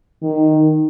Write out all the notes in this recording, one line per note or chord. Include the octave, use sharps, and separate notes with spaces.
D#3